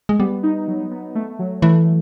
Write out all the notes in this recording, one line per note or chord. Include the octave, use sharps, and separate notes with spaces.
G#3
G3 B3
D#4
F#3
B3
A3
F#3
E3 A3